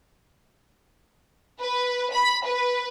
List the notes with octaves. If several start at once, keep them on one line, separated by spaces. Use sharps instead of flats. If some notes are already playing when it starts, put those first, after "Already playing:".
B4
B5
B4